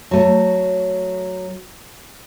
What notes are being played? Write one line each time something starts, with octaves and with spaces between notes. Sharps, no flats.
F#3 A3